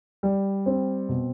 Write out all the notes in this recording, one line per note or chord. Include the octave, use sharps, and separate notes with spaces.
G3
C4
B2